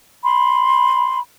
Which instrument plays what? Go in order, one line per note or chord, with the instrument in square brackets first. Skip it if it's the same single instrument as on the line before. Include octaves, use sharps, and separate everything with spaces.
[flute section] B5 C6